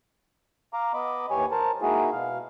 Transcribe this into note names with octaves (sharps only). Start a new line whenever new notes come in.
F5 A#5 D6
B3 D#5 B5 D6
D#2 E3 G4 C#5 G#5
A#4 C5 A5
G#3 A#3 D#4 E4 F#4 G#4
B2 F5